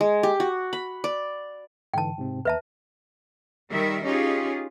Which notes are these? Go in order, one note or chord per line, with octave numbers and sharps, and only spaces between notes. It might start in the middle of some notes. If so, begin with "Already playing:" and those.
G#3
G4
F#4
B5
D5
G#2 D3 E3 G5 A5
G#2 C3 C4
D#2 B4 E5 A5 A#5
D#3 G3 A#4 E5
C#4 D#4 F4 G4 G#4